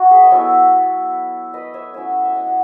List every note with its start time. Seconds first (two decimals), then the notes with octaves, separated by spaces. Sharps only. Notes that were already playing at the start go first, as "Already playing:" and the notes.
Already playing: F#4
0.11 G#4 B4
0.23 D#5
0.31 F#3 B3 E4 A4 C#5
1.54 B4 D#5
1.74 C#5 E5
1.94 F#3 C#4 E4 C#5 E5
2.25 E5
2.35 D#5 F#5
2.47 F#5